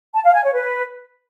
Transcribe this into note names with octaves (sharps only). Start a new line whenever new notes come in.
A5
F5
G#5
C#5
B4